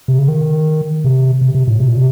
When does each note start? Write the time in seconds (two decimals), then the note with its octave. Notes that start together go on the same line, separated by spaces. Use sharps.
0.08 C3
0.18 C#3
0.28 D#3
1.04 C3
1.41 C3
1.55 C3
1.68 A2
1.80 C3
1.88 A#2
1.96 C3